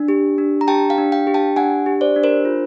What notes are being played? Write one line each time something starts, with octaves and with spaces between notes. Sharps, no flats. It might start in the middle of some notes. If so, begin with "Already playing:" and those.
Already playing: D4
G4
D4
A#5
G4 G5 A5
F5 G5
D4
F5 G5
G4
G5 A5
D4 F#5 G#5
G4
C5 D5
D4
A#4 C5
F4